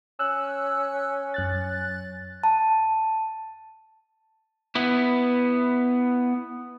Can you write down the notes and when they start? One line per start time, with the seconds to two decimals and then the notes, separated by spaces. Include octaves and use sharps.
0.19 C#4 E6 F#6
1.34 F#2 F#6 A6
2.44 A5
4.75 B3 E4